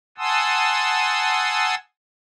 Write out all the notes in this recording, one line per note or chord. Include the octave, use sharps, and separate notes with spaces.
F#5 G#5 A5 C6 D#6 E6